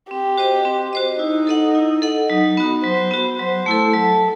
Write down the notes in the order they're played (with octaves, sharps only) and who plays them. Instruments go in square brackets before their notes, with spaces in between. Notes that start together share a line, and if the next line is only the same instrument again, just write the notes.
[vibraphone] C4 [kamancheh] G4
[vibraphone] F#4 C5 D#5
C4
F#4 C5 D#5
[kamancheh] D#4 [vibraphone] E4
[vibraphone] A4 D#5 F#5
E4
A4 D#5 F#5
[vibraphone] F#3 [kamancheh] D#4
[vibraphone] B3 F#4
[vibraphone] F#3 [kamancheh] C5
[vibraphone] B3 F#4
[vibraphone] F#3 [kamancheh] C5
[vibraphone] A3 E4 A4
[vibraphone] F#3 [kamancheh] A4